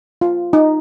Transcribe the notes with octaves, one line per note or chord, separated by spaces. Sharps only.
F4
D#4